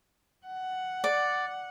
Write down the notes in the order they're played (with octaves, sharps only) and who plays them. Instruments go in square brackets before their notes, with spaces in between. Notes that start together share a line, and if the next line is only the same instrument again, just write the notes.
[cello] F#5
[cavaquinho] D5